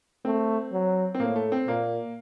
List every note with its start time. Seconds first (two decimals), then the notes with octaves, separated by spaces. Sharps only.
0.25 A3 C4
0.72 F#3
1.15 C4
1.20 A2 A#3
1.36 A3
1.52 C4
1.67 A#2 A#3